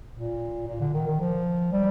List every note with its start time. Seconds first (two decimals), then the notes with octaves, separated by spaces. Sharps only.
0.15 A#2
0.68 A#2
0.81 D3
0.94 D#3
1.07 D#3
1.20 F3
1.72 G3